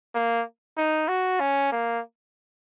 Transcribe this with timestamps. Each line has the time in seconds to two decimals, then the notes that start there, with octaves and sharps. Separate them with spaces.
0.15 A#3
0.77 D#4
1.08 F#4
1.40 C#4
1.72 A#3